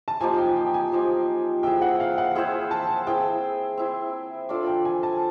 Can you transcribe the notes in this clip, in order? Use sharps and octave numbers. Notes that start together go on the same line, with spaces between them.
A5
F3 A#3 D#4 G4 G#5
G5
G#5
G5
G#5
F3 A#3 D#4 G4
E4 G#4 C5 E5 G5
F#5
F5
F#5
E4 G#4 C5 E5 G5
G#5
A5
G#5
C4 E4 G#4 G5
C4 E4 G#4
D4 F4 A4 D5
G5
G#5
A5